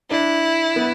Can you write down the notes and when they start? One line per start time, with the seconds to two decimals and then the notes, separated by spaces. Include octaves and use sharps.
0.10 D4 E4
0.76 B3